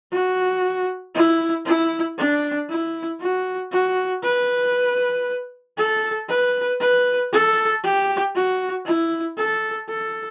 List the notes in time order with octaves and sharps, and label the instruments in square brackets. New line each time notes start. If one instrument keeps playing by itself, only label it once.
[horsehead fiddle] F#4
E4
E4
D4
E4
F#4
F#4
B4
A4
B4
B4
A4
G4
F#4
E4
A4
A4